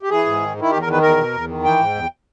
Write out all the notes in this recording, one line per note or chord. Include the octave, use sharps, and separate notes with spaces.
G4
E3 G#4
G#2
D#3
D#3
E4
E2 G4
A#4
D#3 B4
E2 A#4
B2
E2
D#3
E3 G5
G#2
E2